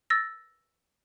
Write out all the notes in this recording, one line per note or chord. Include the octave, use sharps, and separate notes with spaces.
E6 A6 A#6